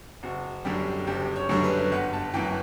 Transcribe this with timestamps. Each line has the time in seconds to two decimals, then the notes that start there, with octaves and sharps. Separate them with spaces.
0.23 F#1 F#4
0.65 F#2 D3 G3 G4
1.07 F#1 G4
1.36 C#5
1.49 F#2 D3 G3
1.64 B4
1.92 G1 F#5
2.13 A5
2.34 F#2 E3 G5